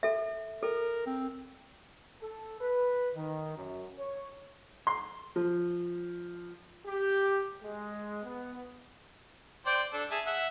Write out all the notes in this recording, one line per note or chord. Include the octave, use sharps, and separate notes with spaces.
A4 E5
A4 A#4
C4
A4
B4
D#3
F#2
C#5
C6
F3
G4
G#3
B3
C5 D5 G5
D4 A4
G#4 E5 A5
E5 F#5